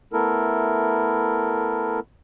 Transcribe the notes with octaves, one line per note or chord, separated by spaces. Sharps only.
A3 B3 E4 A4 A#4